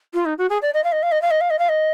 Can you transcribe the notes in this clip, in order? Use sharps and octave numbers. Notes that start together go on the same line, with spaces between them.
F4
D#4
F#4
G#4
D5
D#5
F5
D#5
F5
D#5
F5
D#5
F5
D#5
F5
D#5